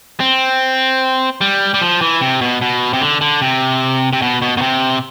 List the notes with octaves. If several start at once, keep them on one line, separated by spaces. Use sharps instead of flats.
C4
G3
G3
F3
E3
C3
B2
B2
C3
D3
D3
C3
C3
B2
B2
B2
C3